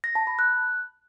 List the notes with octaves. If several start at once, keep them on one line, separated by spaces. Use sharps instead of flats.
A#6
A5
B5
F#6